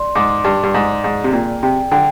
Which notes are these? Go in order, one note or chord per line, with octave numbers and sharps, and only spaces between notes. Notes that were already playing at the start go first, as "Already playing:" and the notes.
Already playing: D5 C6
G#2 D6
G2 D5
G2
G#2 G#5
G#2 G#4
C3
A#2 G5
C3 G5
D3 G5